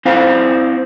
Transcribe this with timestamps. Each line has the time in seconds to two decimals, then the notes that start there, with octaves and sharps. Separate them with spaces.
0.05 C4 E4 C5 F5 G5